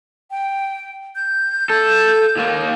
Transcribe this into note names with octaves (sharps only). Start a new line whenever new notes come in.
G5
G6
A4
D#2 A#3